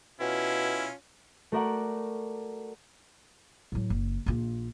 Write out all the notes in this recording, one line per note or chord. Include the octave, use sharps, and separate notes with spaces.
B2 C#4 E4 F4
A3 F#4 A#4 D5 F#5
A2 F#3
F#1
A#1 F4